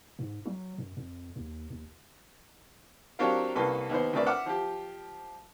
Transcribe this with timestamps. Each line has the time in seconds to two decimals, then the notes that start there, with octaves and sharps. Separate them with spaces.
0.19 G#2
0.46 F#3
0.78 F#2
0.97 F2
1.36 D#2
1.70 D#2
3.19 F#3 C4 D4 G4 A#4 F5
3.55 C2 A#3 C#4 A4 B4 C6
3.90 D#2 B3 C5
4.13 D2 C4 A#4 B4 D5 E5
4.26 E5 F#5 D6 E6 F6
4.46 F3 G4